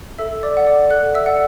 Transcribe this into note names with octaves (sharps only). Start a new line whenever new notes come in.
A4 E5 E6
D5 D6
D5 F#5
D5 D6
A4 F#5 F#6
E5 E6
D5 F#5